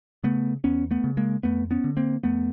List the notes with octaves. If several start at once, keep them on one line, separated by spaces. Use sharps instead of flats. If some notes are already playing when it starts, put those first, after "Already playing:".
C#3 A3 B3
E2 B3 C#4
A3 B3
C#3
G#3 A#3
F2 A3 B3
B3 C#4
D3
A#3 C4
F2 A3 B3